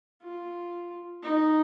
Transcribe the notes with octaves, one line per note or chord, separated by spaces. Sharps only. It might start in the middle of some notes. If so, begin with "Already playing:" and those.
F4
D#4